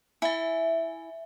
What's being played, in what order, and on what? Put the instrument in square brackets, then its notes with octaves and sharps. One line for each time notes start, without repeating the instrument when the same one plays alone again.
[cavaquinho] E4 [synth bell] E5 G#5